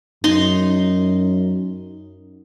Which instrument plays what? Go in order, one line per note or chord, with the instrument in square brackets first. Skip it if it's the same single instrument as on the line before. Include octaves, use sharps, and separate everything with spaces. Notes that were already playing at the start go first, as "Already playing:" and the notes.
[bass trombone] F#2 [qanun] D#4 C6